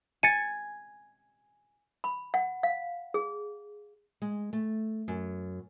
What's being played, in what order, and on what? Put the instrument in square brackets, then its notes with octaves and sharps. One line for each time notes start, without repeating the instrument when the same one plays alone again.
[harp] G#5 [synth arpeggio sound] A6 C#7 D#7
[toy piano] B5
F#5
F5
G#4
[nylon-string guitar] G#3
A3
F#2